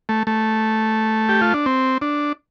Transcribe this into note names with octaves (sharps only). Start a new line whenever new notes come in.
A3
A3
G4
F4
D4
C4
D4